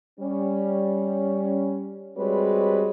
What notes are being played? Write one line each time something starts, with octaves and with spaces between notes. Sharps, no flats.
G3 C#4
G3 G#3 C4 F#4 B4 C#5